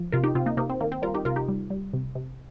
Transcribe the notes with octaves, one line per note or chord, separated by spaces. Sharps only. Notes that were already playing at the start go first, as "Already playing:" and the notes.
Already playing: F3
C3 F4 A#4
D#4 G4
C3 C4 F4
A#3 D#4
C3 A#3 D#4
C4
D#3 A#3
C4
G3 F4 A#4
D#4 G4
C3 F4 A#4
D#4 G4
G3
G3
C3
C3